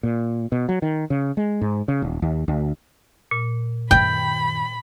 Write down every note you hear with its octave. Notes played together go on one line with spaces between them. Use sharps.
A#2
B2
F#3
D#3
C#3
G#3
G#2
C#3
D#1
D#2
D2
A#2
F#2 D#3 G5 B5